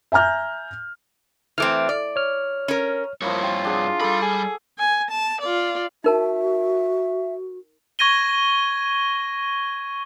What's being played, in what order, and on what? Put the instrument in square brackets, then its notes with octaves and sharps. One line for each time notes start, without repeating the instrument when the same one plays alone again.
[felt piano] E5 G#5 A#5 F6 G6
[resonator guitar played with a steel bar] E3 A3 C4 [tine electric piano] D6 F6
[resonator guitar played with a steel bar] D5
[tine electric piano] C#5 F6
[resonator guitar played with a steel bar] C#4 A#4
[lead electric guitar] G2 C#5 [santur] F3 E4 D#6 [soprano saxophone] A#3
[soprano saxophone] F4 [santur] G5 C#6
[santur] D4 G#4 F#5
[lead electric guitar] G3 B5 [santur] A4 D6 D#6
[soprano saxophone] G#4
[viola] G#5
A5
F4 D5
[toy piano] D#4 A#4 A5 [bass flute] F#4 [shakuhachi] E5
[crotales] C#6 G#6 A#6 D#7 G7